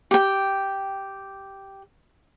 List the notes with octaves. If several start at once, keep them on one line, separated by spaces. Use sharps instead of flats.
G4 G5